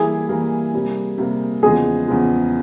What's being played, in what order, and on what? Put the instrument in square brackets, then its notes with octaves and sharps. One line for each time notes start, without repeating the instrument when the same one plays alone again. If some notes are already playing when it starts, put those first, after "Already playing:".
Already playing: [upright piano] E3 G3 A#3 E4 G4 [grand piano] G#4
[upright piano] E3 G3 A#3 E4 G4
C3 G3 A#3
C3 G3 A#3
[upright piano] E2 C#3 F3 G#3 [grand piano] G#4
[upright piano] E2 C#3 F3 G#3